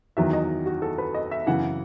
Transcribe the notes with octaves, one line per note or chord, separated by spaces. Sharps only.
E2 D#3 F#3 E5
D#5
F#4
A4
B4
D#5
E5
F#2 C#3 E3 F#5